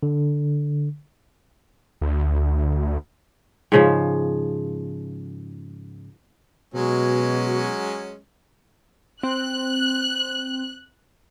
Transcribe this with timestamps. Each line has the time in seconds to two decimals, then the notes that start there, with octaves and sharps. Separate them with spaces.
0.03 D3
2.01 D2
3.72 G#2 C#3 F3
6.74 B2 F#3 G#3 C#4 F#4
9.23 C4 F#6